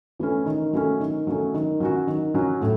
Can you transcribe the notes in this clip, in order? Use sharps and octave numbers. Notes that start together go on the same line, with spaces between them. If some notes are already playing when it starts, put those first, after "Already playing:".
E3 A3 C#4
D#3
F#3 A3 C#4
D#3
F#3 A3 C#4
D#3
F#3 C#4 F#4
D#3
F#3 C#4 F#4
A2